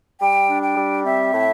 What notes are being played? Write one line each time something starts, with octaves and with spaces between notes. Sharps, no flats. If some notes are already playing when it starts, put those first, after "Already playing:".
G3 G5
D4
G5
G3
C4 E5
A2